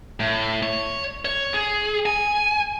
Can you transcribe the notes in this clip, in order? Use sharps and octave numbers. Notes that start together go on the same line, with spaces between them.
A2
C#5
C#5
G#4
G#5